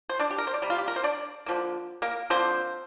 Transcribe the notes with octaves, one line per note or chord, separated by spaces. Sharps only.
C5
D4 D5
G4
A#4
C5
D5
C3 G3
F4
G4
A#4
C5
D4 D5
D3 F3 A#3
A#3 A#4
D3 F3 A#3 C4 C5